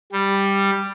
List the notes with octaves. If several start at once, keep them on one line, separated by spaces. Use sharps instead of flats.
G3